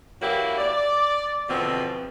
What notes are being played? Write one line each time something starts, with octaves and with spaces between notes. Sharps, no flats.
E3 A#3 C#4 E4 F#4 G4
D5
E2 B2 D3 F3 B3 C4